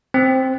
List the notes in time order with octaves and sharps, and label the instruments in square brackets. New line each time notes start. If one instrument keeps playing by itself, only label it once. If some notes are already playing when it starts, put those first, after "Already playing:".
[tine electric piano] C4